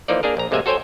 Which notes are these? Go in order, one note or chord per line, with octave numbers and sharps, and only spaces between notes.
E3 F3 A#3 D#4 D5
A#3 D4 G#4 A#4
A#1 A#5
A1 C3 G#3 A#3 E5 G#5
F#4 A4 C5 C#5 G5 G#5